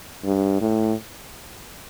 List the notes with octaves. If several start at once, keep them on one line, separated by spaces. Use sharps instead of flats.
G2
A2